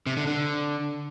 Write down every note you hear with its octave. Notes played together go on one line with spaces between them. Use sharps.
C3
D3
D3